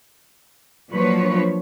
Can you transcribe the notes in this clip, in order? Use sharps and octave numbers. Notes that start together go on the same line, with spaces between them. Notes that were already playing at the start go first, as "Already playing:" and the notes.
F3 F#3 A#3 D4 B4 C#5